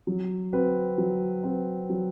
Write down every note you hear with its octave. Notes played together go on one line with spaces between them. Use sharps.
F#3
C4 F#4 B4
F#3
C4 F#4 B4
F#3